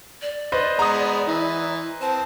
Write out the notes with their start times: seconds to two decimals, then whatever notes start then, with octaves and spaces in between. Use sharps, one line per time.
0.22 D5
0.52 B4 C5 D#5
0.79 G#3 B3 A#5 D#6
1.27 E3
2.02 C4 A5